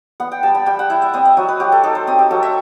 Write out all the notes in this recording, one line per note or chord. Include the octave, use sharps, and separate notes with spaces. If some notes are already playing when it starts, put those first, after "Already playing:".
B3 F#5
G5
G3 A5
B5
G3 G5
F#5
E4 E5
E5
C4 D#5
E5
F#3 D#5
B4
F#3 G4
A4
D#4 A4
C5
C4 D#5
G4
F#3 A4
E5